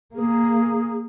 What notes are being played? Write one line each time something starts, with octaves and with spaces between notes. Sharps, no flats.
A#3 G#4